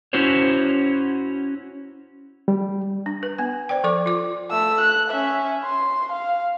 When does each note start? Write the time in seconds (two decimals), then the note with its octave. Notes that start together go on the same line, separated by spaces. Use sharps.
0.13 C#4 E4 F#4 C5 C#5
2.48 G3
3.06 D4
3.23 B4
3.38 B3 G#5
3.69 C5 D5 G5
3.84 F3 A4 D5 D6
4.06 F4 D6
4.51 A3 E6
4.81 F#6
5.11 C#4 E5
5.64 C6
6.13 F5